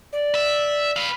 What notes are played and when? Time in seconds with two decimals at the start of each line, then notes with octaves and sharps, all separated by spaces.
0.13 D5
0.35 E5
0.96 B4 F5